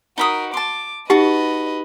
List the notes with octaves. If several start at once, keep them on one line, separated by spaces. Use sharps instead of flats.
D#4 F#4 A#4 B5 D#6
A5 C6 D6
D#4 F#4 G4 B4 D#5 A5